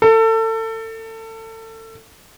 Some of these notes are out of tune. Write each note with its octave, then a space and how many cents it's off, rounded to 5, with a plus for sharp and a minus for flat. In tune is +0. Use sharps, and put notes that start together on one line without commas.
A4 +30